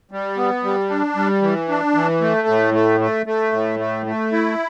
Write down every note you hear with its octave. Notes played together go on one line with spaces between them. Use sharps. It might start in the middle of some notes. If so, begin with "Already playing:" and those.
G3
B3
G3
D4
G3
E3
D4
E3
A3
A2
A3
A3
A3
A2
A3
A3
E4